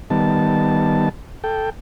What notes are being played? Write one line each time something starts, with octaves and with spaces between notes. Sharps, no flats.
D#3 G3 B3 A5
A4 G5